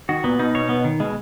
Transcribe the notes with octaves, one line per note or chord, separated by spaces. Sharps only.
D#3 F#4
A#2 B3
B2 D#4
B2 C#5
B3
D#3
B2 G#3